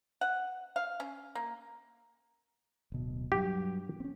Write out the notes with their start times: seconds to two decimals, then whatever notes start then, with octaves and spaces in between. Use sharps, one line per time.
0.21 F#5
0.76 F5
1.00 C#4
1.35 A#3
2.92 D1 B2
3.32 G2 F#3 G4
4.00 C4 C#4